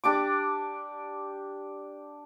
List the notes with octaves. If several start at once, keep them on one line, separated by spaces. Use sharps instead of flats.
D4 G4 D6